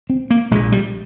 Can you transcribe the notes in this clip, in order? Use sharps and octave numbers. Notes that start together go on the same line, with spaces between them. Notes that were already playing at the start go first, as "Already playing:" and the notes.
C4
A#3
A#1 A#2 G#3
G3